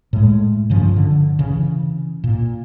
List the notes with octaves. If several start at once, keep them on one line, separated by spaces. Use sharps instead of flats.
A2 G#3
G2 C#3 F3
D3
C#3 E3
A#2